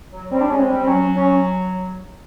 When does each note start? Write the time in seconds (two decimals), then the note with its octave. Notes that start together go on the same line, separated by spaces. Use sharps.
0.12 F#3
0.31 G3 C4
0.41 D4
0.50 G#3 C#4
0.59 C4
0.69 G3
0.80 C4
0.87 F#3 C#4
1.15 C#4